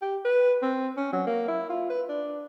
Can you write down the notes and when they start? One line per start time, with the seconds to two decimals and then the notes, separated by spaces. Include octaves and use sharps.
0.02 G4
0.25 B4
0.62 C4
0.97 C#4
1.12 F#3
1.26 A#3
1.48 E4
1.70 F4
1.90 B4
2.09 D4